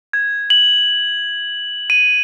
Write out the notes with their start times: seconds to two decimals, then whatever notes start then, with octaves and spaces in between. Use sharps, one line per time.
0.13 G#6
0.50 F#7
1.90 D#7